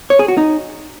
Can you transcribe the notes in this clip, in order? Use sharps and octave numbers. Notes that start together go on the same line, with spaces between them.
C#5
G#4
F#4
D#4